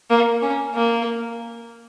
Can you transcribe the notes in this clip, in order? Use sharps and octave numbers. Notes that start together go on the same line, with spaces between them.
A#3
C#4
A#3